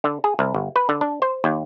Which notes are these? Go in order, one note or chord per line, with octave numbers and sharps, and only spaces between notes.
D3
G#4
C2
G1
B4
D3
D4
C5
D#2